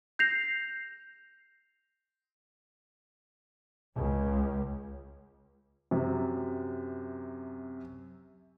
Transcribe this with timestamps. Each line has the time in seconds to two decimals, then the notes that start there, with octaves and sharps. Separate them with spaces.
0.19 G6 A#6 C7 F7
3.96 C#2
5.91 F#2 C3